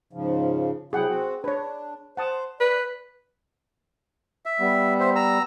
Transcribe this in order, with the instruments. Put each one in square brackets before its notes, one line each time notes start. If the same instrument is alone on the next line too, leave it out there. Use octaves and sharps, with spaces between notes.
[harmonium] G#2 C#3 F3
[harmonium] C3 F#3 E4 [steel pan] G#4 F#5 G5
[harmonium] C4 F#4
[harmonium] D4 [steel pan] B4 C#5
[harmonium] C5 [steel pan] F#5 A5 D#6
[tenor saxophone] B4 [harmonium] D5
[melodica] E5
[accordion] G3 B3
[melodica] C5 E5
A#5 E6